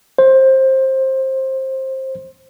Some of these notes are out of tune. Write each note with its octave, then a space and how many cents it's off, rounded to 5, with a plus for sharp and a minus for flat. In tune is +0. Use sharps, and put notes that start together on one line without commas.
C5 +20